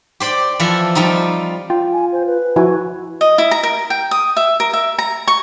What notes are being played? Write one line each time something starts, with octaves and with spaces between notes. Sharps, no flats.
G4 C5 D5 G5
E3 F3 E4 A4 E5
F3 G3 C4 D#4
F4 G5
G#5
C5
B4
F3 E4 F#4 G#5
D#5
E4
A#5
A#4
G5
D#6
E5
A#4
E5
A#5
C#6